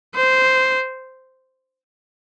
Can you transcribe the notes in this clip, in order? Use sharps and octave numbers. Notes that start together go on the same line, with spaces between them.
C5